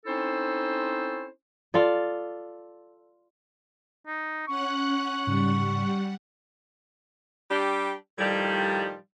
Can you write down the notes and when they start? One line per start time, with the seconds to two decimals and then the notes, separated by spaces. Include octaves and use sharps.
0.06 C4 C#4 D#4 E4 A4 C5
1.74 F4 A4 D5
4.07 D#4
4.47 C#4 F#5 C#6 F#6
5.27 G#2 C#3 G3 F#5
7.49 G3 D4 G4
8.18 A2 D#3 F3 G3